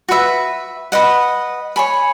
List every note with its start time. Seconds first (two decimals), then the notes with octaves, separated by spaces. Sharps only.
0.09 F#4 B4 E5
0.92 B4 D#5 F#5
1.76 C#5 G#5 B5